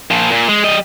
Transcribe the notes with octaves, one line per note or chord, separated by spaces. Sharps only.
A#2 F3
A#2
G#3
G3 D#5